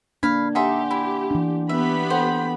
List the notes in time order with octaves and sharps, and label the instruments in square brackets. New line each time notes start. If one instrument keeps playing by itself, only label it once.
[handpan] A#3 D4 [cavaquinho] F5 B5 [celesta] G#6
[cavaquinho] D#4 A4 E5 [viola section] G4 [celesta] F#5 G#5 C6
[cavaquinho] E4
[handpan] E3 D4
[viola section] B3 G4 B5 [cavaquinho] E5
[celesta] A4 F#5 G5 [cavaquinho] C5